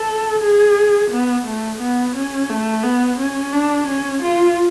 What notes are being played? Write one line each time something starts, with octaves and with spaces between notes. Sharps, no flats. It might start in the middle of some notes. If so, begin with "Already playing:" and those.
Already playing: A4
G#4
B3
A3
B3
C#4
A3
B3
C#4
D4
C#4
F4